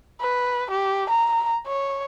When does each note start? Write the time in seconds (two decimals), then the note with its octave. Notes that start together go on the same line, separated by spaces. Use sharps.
0.21 B4
0.71 G4
1.10 A#5
1.67 C#5